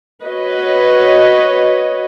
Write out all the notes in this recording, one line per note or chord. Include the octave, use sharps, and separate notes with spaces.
F#4 B4 C#5 D#5